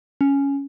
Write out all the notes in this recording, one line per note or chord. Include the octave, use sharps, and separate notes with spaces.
C#4